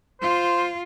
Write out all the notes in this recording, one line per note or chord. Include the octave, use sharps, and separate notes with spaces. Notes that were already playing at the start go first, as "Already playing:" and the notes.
F4 C5